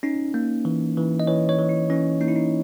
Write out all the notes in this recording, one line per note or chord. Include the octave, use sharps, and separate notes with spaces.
C#4 D#4
A#3
E3
E3
D#5
E3 C#5
C#5
E3
E4
E3 C#4
A#3 D#4
E4
D#4